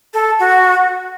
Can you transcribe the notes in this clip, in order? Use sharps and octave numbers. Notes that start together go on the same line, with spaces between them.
A4
F#4